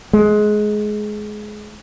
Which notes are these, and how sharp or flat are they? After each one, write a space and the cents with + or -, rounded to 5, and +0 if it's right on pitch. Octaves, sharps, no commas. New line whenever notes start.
G#3 +20